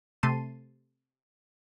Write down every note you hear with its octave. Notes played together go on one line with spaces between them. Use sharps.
C3 A3 A5 C6 D#7